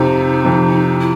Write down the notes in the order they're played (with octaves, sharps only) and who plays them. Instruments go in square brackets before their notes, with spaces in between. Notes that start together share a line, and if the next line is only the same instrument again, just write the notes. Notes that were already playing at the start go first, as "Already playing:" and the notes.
Already playing: [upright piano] F2 C3 F3 [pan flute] D#4
[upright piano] F2 C3 F3
[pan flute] E4